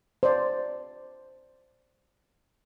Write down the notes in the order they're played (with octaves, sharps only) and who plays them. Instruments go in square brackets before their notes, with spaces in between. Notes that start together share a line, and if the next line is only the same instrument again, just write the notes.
[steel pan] C5 D5